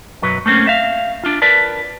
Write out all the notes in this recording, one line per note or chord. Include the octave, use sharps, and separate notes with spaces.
B1 F#2 F#3 B4
A3 A#3 C4 C#4
E5 F5
D4 F4
A#4 B4 D5 A5